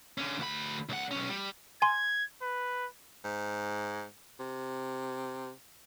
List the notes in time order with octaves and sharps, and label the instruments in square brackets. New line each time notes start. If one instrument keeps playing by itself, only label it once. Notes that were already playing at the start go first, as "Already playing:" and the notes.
[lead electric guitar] D3 C#4
D2 B5
C#2 F#5
B1 C#4
G3
[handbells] G#5 C6 [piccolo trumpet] G#6
[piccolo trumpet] B4
[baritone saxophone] G#2
C3